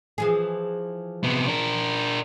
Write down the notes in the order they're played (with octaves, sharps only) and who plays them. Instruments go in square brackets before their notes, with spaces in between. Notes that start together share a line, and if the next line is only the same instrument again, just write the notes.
[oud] E3 F3 G#4
[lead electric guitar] C3 B3
D4 A#4